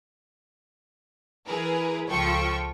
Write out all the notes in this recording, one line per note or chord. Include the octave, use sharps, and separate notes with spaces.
E3 E4 G#4 A#4 B4
C#2 F3 F4 A4 G5 C#6